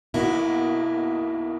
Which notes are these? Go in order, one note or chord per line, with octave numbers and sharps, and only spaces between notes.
B1 B2 A#3 D#4 E4 F#4